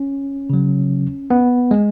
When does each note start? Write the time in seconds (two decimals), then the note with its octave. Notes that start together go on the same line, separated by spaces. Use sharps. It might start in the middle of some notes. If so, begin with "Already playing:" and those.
Already playing: C#4
0.50 C#3 F#3
1.30 B3
1.71 G#3